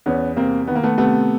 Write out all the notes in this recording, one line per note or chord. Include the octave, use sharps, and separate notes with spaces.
E2 B3 C#4
C3 A#3 C4
D#3 B3
A#3
A3 B3
C3 A3 B3